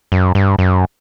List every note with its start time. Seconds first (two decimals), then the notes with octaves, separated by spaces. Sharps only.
0.12 F#2
0.35 G2
0.59 F#2